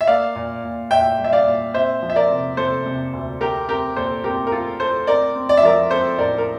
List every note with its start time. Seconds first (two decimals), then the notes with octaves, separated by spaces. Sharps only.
0.01 E5
0.07 A#3 D5 F5
0.35 A#2
0.63 A#2
0.91 A#2 E5 G5
1.19 G3
1.24 E5
1.32 D5 F5
1.47 A#2
1.74 C4 C5 E5
2.03 F3
2.10 E5
2.16 A#4 D5
2.30 C3
2.57 C3 A4 C5
2.86 C3
3.13 D2
3.41 A3 G4 A#4
3.69 C4 G4 A#4
3.96 A#2 A4 C5
4.24 C4 G4 A#4
4.47 A#4
4.52 A3 F4 A4
4.80 A3 A4 C5
5.07 C4 A#4 D5
5.35 C4
5.49 D5
5.57 E5
5.63 F3 A#4 D5
5.91 C4 A4 C5
6.19 A2 A#4 D5
6.38 A#4